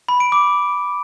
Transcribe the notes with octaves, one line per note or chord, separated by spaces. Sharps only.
B5
D7
D6